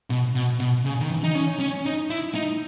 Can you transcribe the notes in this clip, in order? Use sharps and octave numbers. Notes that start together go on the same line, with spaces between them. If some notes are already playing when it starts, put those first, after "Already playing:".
B2
B2
B2
C#3
D#3
E3
D#4
C#4
C#4
D#4
E4
D#4